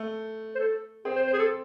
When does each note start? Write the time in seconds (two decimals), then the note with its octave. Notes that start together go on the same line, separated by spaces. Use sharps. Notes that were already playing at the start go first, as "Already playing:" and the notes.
Already playing: A3
0.55 C5
0.59 A4
1.05 C4 G#4
1.16 C5
1.27 C5
1.33 G#4
1.39 A4